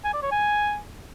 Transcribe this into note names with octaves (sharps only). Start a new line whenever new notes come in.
G#5
D5
C#5
G#5